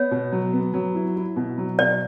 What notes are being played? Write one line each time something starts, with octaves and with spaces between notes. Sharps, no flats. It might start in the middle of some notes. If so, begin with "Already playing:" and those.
Already playing: B3 C#5
B2
F#3
B3
F#3
E4
E4
B2
F#3
B2 D5